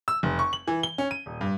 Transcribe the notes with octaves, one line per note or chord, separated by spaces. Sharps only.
E6
F1
C#6
F#7
E3
G7
C#4
D#7
D#1
G2